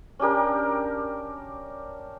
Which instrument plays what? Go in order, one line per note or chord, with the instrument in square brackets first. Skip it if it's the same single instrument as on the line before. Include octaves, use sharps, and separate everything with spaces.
[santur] C#4 D4 G4 A#4